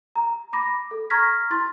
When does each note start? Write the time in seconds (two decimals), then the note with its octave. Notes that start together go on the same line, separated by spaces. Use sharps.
0.15 A#5
0.53 B5 D6 A#6
0.91 A4
1.10 A#5 C#6 F6 G#6 A#6 B6
1.50 E4 C6 A6